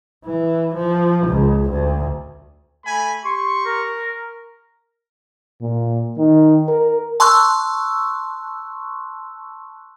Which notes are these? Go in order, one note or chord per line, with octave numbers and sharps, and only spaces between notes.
E3
F3
C#2
D2
A3 G#5 B5
G4 C6 C#6
A#4
A#2
D#3
A#4
A5 C6 C#6 E6 F#6